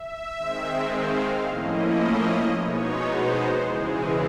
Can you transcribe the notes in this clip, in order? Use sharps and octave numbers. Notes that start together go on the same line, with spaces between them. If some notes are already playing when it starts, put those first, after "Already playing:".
Already playing: E5
D#3 G#3 C4
F5
A2 F3 A#3 C#4 E4 D#5
B2 G#3 B3 D#4 C#5
C5
E2 C#3 E3 G#3 G#4